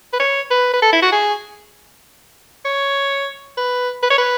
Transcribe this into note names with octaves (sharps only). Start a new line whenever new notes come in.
B4
C#5
B4
B4
A4
E4
F#4
G#4
C#5
B4
B4
C#5
B4